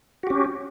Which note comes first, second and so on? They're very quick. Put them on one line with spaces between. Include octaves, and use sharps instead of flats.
F#4 G4 C#4